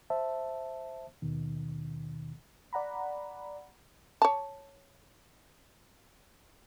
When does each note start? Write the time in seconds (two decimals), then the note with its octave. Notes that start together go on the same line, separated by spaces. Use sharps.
0.10 C5 E5 A5
1.22 D#2 B2 D#3
2.73 D5 F#5 A#5 B5
4.22 C#5 A5